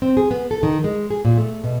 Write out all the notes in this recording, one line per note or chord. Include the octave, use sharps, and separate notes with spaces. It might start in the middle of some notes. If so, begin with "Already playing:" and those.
C4
G#4
B3
A4
D#3
G#3
G#4
A#2
A3
B2